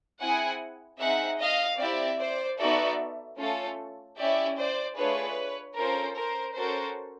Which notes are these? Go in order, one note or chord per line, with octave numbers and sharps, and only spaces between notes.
C4 E4 G#4 F#5 G#5
C4 D#4 G#4 E5 F#5
D#5 F5
C4 E4 G4 D5 E5
C5 D5
B3 D#4 F#4 A4 D5 E5
A3 C#4 F4 A4
C#4 E4 G4 D5 E5
C5 D5
A3 D4 F4 G#4 B4 C#5
C#4 F4 A4 A#4 C5
A#4 C5
C#4 F#4 A4 A#4 C5